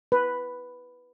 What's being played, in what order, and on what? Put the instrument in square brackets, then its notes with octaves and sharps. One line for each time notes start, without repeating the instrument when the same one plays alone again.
[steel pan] B4